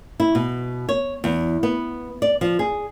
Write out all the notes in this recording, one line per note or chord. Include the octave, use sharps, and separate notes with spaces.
E4
B2
C#5
E2
B3
D5
F3
G#4